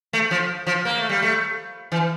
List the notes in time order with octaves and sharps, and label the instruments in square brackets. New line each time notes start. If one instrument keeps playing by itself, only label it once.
[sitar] A3
F3
F3
A#3
A3
G3
A3
E3